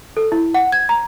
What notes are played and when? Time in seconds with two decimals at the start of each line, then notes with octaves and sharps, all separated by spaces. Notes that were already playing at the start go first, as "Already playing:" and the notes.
0.17 A4
0.32 E4
0.54 F#5
0.72 G#6
0.89 A#5